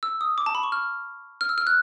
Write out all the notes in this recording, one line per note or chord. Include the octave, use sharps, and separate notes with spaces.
E6
D#6
D6
A5
B5
C#6
F6
F6
E6
F6
F#6